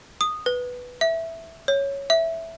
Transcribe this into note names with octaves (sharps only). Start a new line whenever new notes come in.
D#6
B4
E5
C#5
E5